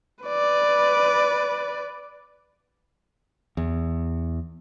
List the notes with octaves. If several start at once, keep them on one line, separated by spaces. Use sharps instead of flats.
B4 D5
E2